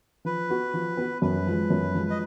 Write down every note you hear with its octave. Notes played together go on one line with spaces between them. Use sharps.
F3 B4
B3 F#4
F3
B3 F#4
F#2 B4
F3 G#3
F#2
F3 G#3
D#5